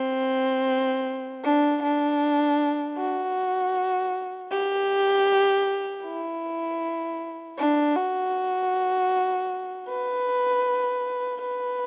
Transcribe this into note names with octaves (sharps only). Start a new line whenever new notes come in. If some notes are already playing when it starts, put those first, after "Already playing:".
Already playing: C4
D4
D4
F#4
G4
E4
D4
F#4
B4
B4